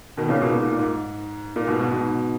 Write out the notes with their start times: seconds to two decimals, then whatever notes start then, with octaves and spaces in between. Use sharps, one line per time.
0.17 B2 D#3
0.29 A#2 C#3
0.41 G#2 B2
0.52 A#2
0.64 G#2
0.72 A#2
0.79 G#2
1.56 A#2
1.68 G#2 B2
1.79 G#2 B2
1.91 G#2 B2